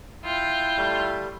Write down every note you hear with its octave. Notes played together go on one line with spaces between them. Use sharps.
E4 F4 G5
G3 A3